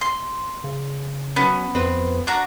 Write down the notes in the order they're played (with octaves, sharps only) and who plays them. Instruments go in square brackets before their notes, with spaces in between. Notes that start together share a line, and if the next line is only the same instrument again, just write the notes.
[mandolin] C6
[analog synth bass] C#3
[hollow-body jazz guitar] F#3 C#4 [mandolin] B3
[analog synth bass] F2 [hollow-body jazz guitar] C4 B4
[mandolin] D4 F#4 A#5